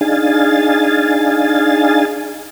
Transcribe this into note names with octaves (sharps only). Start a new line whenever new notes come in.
D4 D#4 G#4 F5 G#5 A6